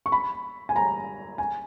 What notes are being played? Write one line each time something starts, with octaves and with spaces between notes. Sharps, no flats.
C#6
B5
G#5
A#5
G#5